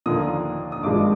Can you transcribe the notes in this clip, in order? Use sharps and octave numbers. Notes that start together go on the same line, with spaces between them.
D#2 D3 F3 A#3 D#6
D#6
G#1 G2 F3 G#3 D6